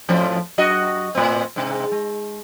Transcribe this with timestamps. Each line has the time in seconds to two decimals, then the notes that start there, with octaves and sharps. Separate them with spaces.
0.09 F2 A2 F3
0.58 F#2 F#4 D#5
1.15 A2 C4
1.56 G#2 C3
1.92 G#3